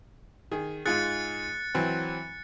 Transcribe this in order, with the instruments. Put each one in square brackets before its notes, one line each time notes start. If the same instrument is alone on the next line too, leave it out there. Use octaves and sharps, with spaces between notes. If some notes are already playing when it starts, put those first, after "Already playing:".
[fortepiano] D#3 G#4
[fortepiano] G#2 F4 G#4 [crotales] F#6 A6 C#7
[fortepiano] E3 F#3 C4